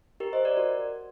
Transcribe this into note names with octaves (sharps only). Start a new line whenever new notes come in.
G4 A#4
C5 D#5
A#4 D5
F#4